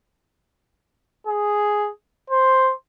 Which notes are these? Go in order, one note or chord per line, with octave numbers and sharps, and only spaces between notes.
G#4
C5